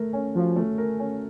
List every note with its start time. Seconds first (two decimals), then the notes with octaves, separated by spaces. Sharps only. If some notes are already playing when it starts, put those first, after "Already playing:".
Already playing: A3 A#4
0.13 C#4
0.35 F3 F#4
0.56 A3
0.78 A#4
0.99 C#4